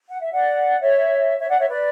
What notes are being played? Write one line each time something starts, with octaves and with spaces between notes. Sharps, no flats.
F#5
E5
D5 F#5
C#5 E5
C#5 E5
D5 F#5
C#5 E5
B4 D5